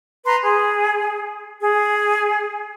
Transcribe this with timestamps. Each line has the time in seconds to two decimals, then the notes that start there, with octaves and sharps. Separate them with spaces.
0.24 B4 A#5 C6
0.42 G#4
1.60 G#4